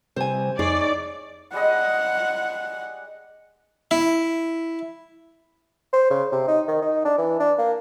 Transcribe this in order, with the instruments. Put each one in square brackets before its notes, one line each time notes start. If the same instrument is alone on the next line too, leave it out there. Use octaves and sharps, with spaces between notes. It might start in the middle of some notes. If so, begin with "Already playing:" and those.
[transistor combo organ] C3 G3 [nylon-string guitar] C5 G#5
[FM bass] F2 [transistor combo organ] D#4 C#5 [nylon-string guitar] G#4 [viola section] D5
[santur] G3 G#3 D#5 [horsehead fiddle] F#5
[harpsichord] E4
[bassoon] C5
C#3
C3
D#4
D#3
D#4
D4
E3
D4
A#3